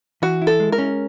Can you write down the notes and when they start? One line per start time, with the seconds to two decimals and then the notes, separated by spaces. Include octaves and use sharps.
0.22 E3 F#4
0.42 E4
0.47 A4
0.60 G#3
0.72 A#4
0.78 C#4